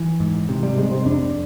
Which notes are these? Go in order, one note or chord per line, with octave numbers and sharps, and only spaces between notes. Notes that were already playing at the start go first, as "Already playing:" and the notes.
Already playing: E3
G#2
C3
G3
C3 G#3
C4
F2 D4